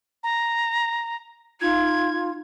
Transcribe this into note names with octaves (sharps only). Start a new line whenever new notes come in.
A#5
D#4 F4 G#6